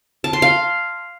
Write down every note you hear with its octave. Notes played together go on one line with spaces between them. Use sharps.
A5
C6
F5